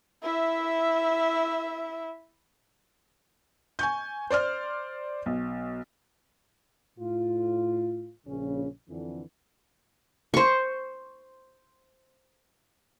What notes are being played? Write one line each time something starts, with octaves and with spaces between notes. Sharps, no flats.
E4 E5
G#5 C#6 G6
C5 D5 C6 F6
B1
A2 F4
A#1 C#3 C#4
F2 D3 E3
C5 C#6